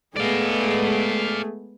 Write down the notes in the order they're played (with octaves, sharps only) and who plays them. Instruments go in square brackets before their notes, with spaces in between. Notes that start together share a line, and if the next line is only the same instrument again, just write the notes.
[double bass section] G#3 B3 [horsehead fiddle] A3 G#4 [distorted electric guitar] D5 F5